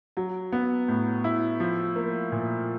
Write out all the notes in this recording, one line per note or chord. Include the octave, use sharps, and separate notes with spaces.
F#3
B3
A2
E4
F3
A#3
A#2